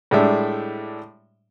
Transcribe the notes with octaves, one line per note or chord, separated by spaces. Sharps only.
A2 G3 G#3 D4 E5